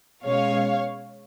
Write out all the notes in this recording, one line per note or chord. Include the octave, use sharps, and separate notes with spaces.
B2 G#3 C#4 C#5 F5